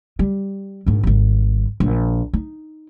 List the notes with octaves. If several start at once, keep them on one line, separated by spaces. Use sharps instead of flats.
G3
A#1 G#2
G#1 G3
A#1
D#4